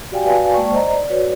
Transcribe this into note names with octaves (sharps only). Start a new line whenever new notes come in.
F#4 G4 D5 F5 G5 G#5
F#4 B4 D5 F5 G#5 A5
G#3 A#3 D5 G5 A5 C#6
C5 D5 D#5 A#5
D5
F#4 B4 C#5 D5